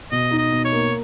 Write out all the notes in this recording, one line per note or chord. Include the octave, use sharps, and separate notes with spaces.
B2 D#5
D#4
D#5
B2
C#5
A#3